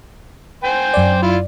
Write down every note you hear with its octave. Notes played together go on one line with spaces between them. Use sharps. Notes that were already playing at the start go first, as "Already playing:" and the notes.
C5 G5 G#5
F#2 D5
E4 F4